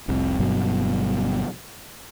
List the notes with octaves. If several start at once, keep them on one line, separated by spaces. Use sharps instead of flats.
F1 C2 C3
G1 G2 B2 F#3